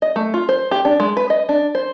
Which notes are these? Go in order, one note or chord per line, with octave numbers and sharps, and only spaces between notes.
D#5
A3
F4
C5
G4
D4
G#3
B4
D#5
D4
C5